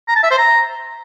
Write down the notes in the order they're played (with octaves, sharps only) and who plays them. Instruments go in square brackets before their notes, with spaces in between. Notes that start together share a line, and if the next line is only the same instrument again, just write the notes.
[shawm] A#5
A5
E5
C5
A#5